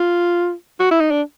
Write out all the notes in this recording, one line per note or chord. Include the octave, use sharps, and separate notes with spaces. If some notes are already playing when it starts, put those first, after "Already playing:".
Already playing: F4
F#4
E4
D#4
D4